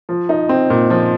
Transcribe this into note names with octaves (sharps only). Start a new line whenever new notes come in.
F3
D#4
C4
A#2
F3